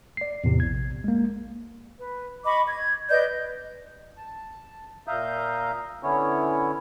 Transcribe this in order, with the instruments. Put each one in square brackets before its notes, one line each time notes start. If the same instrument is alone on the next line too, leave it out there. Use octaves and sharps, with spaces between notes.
[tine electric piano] D5 C7
E2 A2 C3
A#1 G#6
G#3 A#3
[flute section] B4
D#5 B5 C#6 D6
G#6
B4 D5 D#5 G6
[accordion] A5
A#2 E5 F5 A#5 D#6 G6
D3 B3 C#4 E4 C#5